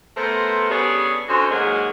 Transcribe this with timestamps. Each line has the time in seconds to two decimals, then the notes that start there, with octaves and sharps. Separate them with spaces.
0.17 A3 B3 A#4 C5
0.70 G3 B3 C#4 D4 G#4 A4
1.28 D3 C#4 D#4 F#4 C5
1.51 D#2 G#2 F#3 G#3 A#3 G#4